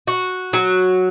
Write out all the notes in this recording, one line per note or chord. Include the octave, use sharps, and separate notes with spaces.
F#4
F#3